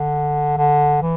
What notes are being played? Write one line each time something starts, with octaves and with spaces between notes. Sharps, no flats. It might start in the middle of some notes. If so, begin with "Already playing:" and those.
Already playing: D3
D3
E3